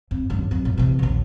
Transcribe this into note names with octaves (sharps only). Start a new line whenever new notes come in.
F2
F#2 D3
F2 F#3
A#2
C3 E3
A#1 D#2